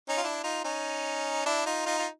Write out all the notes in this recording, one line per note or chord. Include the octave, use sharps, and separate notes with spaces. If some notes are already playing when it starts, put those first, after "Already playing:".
C#4 D#4
F4
D4 E4
D#4 F4
C#4 D#4
D4 E4
D#4 F4
D#4 F4
F4